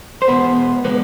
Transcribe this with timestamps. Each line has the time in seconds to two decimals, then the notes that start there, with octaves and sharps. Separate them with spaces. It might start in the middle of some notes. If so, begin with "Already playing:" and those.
0.22 C5
0.28 E2 B2 G#3 B3 B4
0.84 D3 F3 G#3 B3 B4